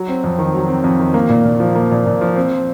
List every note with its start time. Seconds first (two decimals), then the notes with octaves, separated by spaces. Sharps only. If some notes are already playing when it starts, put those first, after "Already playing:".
Already playing: F#3
0.09 C4
0.24 F2
0.39 D#3
0.54 F#3
0.68 C4
0.84 F2
0.99 D#3
1.14 A#3
1.29 A#2
1.45 A#2
1.60 F3
1.75 A#3
1.91 A#2
2.06 A#2
2.21 F3
2.36 C4